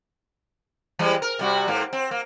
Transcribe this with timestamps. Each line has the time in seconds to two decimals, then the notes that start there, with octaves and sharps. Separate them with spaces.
0.99 E3 G3 G#3
1.22 A#4
1.39 C3 G3 F#4
1.68 G#2 A#3
1.93 C4
2.11 A#3